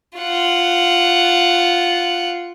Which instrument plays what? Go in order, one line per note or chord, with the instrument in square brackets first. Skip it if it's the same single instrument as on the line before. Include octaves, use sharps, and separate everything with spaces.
[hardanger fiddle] F4 F#5